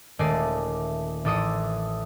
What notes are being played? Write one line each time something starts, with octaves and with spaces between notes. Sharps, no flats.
D#1 G#3 A3 D5 C7 D#7
A1 A4 D6 D#6 C#7